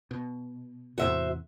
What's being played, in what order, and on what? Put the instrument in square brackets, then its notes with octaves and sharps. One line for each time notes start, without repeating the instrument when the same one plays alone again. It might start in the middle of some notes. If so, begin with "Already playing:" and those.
[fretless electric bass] B2
[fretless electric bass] E2 A2 C3 [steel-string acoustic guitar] F#4 C5 E5